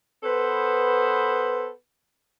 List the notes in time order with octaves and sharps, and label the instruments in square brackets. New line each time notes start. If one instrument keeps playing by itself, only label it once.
[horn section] B3 A4 B4 C5